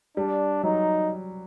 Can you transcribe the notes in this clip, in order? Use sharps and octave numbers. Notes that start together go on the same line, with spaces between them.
G3 D4
F#3 D#4